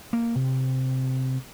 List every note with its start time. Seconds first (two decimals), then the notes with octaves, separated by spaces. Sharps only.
0.13 A#3
0.35 C3